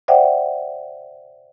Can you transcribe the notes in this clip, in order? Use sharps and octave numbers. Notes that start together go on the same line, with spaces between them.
C5 D5 E5 F#5 G5